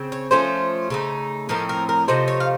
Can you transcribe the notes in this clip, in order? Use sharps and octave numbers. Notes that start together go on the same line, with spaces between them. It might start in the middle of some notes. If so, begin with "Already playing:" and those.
Already playing: C#3 C4
C#5
F3 A3 C#4 C5
C#3 A3 D#4
A2 F3 C4 D#4 A#4
A#4
A#4
C3 F3 A3 D#4 C5
C#5
F5